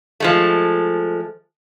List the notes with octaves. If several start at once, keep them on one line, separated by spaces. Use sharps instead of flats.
F3 G#3 A3